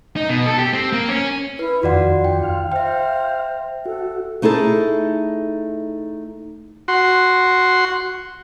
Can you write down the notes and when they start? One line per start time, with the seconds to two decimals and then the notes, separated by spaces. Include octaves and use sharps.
0.16 D#4
0.29 B2
0.46 A4
0.59 G4
0.74 C4
0.93 A#3
1.09 C#4
1.59 E4 B4
1.83 F2 D#3 F4 F#4 D5 F#5
2.24 G5
2.43 F5
2.72 C5 E5 G5
3.86 F#4 A4
4.42 A3 D#4 E4 G#4 A4
6.88 F#4 C6